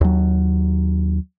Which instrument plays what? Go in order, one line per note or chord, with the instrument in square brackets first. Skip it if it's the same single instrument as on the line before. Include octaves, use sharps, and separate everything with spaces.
[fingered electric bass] D#2 F#3